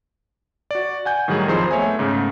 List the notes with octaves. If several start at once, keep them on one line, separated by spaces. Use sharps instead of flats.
F#4 D5
F#5 G#5 G6
A2 D#3 F#3 G3 G#4
F2 F3 D#4 G#4 C5 C6
A3 B3 C#5 E5 G#5
G#2 C#3 A3